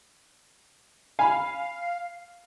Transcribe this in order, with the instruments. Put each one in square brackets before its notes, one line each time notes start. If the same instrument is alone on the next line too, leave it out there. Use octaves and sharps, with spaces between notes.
[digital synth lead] F5 [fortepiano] G#5 B5